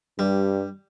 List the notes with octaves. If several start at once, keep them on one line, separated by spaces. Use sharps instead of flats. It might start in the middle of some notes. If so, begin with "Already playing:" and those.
G2 G3